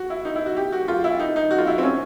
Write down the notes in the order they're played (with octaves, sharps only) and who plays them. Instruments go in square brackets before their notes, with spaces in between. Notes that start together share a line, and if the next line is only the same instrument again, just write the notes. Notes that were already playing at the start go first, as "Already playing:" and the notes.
Already playing: [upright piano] F#4
E4
D#4
E4
F#4
G4
F#4
F4
E4
D#4
D#4
F#4
F4
E4
C4
C#4